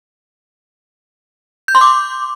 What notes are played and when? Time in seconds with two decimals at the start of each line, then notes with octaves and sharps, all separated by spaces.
1.68 G6
1.75 C6
1.81 D6